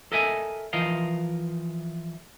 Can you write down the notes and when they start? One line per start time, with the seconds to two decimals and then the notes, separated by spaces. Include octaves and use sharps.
0.12 A4 A#4 D#5 E5 G#5
0.73 E3 F3 A#4 D#5 F5